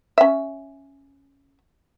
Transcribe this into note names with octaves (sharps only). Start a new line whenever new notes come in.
C#4 E5